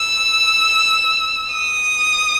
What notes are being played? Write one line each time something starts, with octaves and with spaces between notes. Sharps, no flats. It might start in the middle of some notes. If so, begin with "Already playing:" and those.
Already playing: E6
D#6